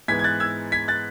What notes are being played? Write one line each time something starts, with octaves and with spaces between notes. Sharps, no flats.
G#2 E3 G#3 B3 G#6 B6
G#6
F#6 A6
E6 G#6
G#6 B6
F#6 A6